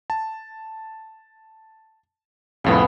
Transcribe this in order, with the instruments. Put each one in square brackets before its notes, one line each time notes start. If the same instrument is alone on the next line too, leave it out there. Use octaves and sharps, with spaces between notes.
[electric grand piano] A5
[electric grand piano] C2 F2 A2 [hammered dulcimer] C#3 B3